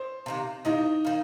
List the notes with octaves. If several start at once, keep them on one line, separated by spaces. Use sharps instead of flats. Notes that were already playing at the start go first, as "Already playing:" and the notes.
Already playing: C5
C3 D#3 A#3
C3 D#3 A#3 D#4 D#5
D#3 A#3